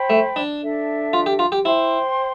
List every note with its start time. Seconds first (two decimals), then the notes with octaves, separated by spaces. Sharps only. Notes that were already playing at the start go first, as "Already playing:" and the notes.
Already playing: C5 G5 B5
0.10 A3
0.36 D4
0.62 D4 A4 E5
1.13 F4
1.26 G4
1.39 F4
1.52 G4
1.65 E4 C5 G5 C6